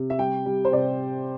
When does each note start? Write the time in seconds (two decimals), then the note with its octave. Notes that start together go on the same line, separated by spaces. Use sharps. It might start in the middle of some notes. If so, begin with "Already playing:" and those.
Already playing: C3
0.10 E5
0.18 G3 G5
0.46 G3
0.65 C5
0.72 C3 D5